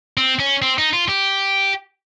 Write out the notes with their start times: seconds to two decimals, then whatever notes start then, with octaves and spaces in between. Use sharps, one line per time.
0.17 C4
0.40 C#4
0.62 C4
0.78 D#4
0.93 F4
1.08 G4